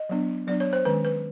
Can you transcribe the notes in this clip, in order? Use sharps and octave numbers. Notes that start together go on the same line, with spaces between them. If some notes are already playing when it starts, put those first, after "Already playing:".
Already playing: D#5
F#3 B3 D4
F#3 B3 D4 D5
C#5
C5
D#3 G#3 C#4 B4
B4